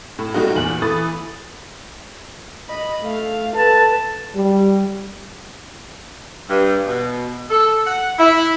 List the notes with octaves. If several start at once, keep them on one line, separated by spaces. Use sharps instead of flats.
A2
G3 A3 A#3 D#4 F4 F#4
E2 A#2 F#7
E3 A3 B5 D#6 A6
D#5 B5
A3 F5
A4 B4 A5
G3
G2
B2
A4
F#5
E4